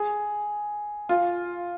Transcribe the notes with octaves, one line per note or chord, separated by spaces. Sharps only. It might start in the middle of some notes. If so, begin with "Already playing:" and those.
Already playing: G#4
F4